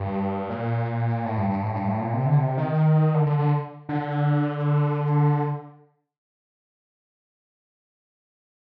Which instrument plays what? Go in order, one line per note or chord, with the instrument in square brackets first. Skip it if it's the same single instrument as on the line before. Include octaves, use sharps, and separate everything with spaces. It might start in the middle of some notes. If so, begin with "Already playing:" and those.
Already playing: [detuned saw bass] G2
A#2
A2
G2
G2
A2
G2
A2
A#2
C3
D3
C3
D#3
D3
D3
D3
D3